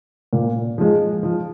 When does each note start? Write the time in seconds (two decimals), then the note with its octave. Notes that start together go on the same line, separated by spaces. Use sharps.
0.33 A#2
0.78 F3 G#3
1.23 F3